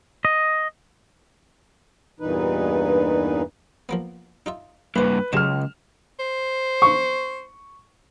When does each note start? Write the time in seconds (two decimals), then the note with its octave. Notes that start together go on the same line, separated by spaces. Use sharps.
0.25 D#5
2.20 E2 G2 A#2 E3 D#4 B4
3.89 F3 A#3 B3
4.46 D#4 F4 E5
4.96 G2 A#3 E4 B4 C5
5.33 C#2 F#3 G#3 A3 F6 E7
6.19 C5
6.82 C#6